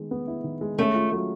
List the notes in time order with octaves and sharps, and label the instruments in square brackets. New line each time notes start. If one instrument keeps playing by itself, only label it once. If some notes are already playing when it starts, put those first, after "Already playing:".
Already playing: [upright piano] D#3 G#3 B3
B3
E4
D#3
G#3
[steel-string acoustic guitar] A3 [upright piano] C#4
[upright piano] F4
F#3